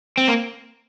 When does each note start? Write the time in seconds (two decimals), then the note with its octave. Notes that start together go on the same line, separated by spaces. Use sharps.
0.18 C4
0.28 A#3